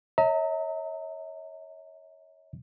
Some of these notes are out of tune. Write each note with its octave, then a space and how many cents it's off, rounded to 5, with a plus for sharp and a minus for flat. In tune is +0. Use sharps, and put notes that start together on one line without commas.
C#5 +0 E5 -45 A#5 -35